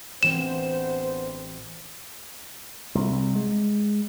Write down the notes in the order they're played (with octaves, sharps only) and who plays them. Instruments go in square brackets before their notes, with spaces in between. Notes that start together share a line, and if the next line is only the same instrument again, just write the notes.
[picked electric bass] A1 E3 C4 [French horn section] D2 B3 C5 [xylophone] E7
[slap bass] C2
G#3